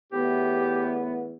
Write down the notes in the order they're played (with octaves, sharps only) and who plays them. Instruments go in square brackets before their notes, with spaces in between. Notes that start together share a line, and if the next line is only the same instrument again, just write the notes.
[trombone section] E2 A2 B3 [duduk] G4